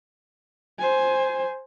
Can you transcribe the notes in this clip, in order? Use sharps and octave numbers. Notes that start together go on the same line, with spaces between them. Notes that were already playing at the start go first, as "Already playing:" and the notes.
C5 G#5